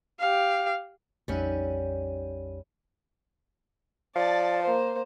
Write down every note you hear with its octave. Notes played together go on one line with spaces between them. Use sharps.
G4 F5
A#1 F2 G3 C#4 D#4
F3 D5 A5
A#3 C5